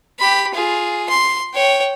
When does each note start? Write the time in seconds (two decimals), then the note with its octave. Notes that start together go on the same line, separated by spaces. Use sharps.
0.19 G4 B5
0.54 F4 G#4
1.09 C6
1.54 C#5 G5